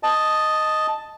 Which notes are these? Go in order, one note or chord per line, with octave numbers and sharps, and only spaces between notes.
D#5 A5